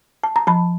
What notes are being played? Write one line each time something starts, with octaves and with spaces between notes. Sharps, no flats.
A5
A#5
F3 A5 B5